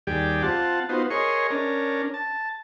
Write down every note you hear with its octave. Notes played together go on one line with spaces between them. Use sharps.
D#2 G3 G4 G#4 D5
C4 F4 F#5 A5
B3 D#4 F4 F#4 C5
G#4 A#4 C#5 D#5 C6 C#6
C#4 D4 A#4
A5